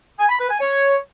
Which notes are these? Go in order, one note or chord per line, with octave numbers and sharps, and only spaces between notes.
G#5
B5
B4
G#5
C#5